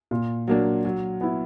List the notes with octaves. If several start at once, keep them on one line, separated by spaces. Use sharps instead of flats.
A#2
F#3 A#3 D4
F#3
B3 E4